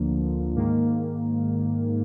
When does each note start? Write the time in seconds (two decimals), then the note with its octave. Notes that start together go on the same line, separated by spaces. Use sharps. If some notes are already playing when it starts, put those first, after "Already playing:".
Already playing: D2 D3 F3 A#3
0.55 G#2 D#3 A#3